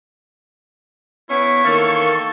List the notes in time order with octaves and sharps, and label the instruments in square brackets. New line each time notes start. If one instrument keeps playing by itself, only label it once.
[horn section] B3 C#4 [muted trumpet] E4 [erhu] C#6
[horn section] D#3 E3 A#3 [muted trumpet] A4